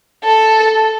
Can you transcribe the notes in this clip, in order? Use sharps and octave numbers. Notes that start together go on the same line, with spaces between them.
A4